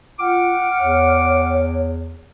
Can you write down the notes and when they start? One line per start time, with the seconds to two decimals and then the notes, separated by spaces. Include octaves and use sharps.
0.19 F4 F#5 G5 D6 F6
0.80 E2 C#5